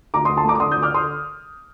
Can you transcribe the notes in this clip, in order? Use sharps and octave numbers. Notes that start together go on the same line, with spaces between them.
D2 A#5 D6
C6 D#6
D2
A5 C6
A3 A#5 D6
D6
D3 C6 D#6
D#6 G6
D2
D6 F6
D3 C6 D#6